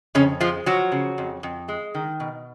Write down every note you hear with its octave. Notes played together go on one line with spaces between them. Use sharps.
F2 C#3 C#4
F3 G#3 F4
F3 F#3 F#4
C#3
F2
F2
G#3
D#3
B2